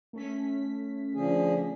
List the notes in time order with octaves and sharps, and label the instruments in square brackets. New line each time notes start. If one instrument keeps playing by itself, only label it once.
[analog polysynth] A3 C#4 B6
[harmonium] D3 F3 G#4